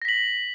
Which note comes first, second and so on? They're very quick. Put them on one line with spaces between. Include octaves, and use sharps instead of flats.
A#6 B6 F#7